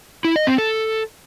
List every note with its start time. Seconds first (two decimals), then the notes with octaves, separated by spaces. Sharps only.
0.25 E4
0.36 D#5
0.47 C4
0.58 A4